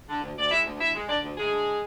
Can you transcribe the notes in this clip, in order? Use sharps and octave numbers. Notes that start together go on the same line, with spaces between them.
D3
D2
D2 D5
G#3 E4 E5
D2
D2 E4 E5
G#3
D3 D4 D5
D2
D2 G#3 G#4
D3